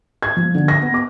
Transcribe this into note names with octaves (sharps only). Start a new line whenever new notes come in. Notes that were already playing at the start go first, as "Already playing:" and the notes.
G#6
F3
D3
A#6
B3
D6